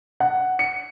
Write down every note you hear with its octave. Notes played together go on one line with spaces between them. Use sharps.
F#5
C#7